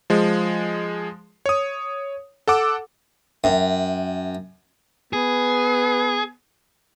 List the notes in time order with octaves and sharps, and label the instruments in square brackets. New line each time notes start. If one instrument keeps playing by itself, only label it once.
[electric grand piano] F3 G#3
C#5 D#6
A4 F#5 D6 E6
[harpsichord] F#2 [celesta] E5 G5
[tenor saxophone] B3 [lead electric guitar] G#4